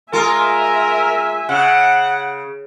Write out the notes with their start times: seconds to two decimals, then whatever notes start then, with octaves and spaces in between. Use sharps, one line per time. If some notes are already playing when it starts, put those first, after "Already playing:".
0.13 G#3 F4 A#4 E5 G#5
1.49 C#3 F#5